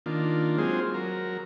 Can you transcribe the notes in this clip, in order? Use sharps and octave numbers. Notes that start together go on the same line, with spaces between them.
D#3 A#3 D4 F4
F#3 G#3 C4 F4 G#4 C5
F#3 A#4